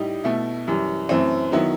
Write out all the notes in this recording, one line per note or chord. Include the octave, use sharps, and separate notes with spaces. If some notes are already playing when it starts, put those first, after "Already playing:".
Already playing: A2 G3 D#4 G4
B2 A3 E4
F#2 E3 G3
F#2 E3 A3 C4
D#3 F#3 B3 E4